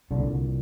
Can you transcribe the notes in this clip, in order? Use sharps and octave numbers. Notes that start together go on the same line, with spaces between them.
C2 A#2 D3